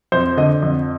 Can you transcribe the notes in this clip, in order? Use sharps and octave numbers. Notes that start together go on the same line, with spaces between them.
F2 C5
D3 D#5
F2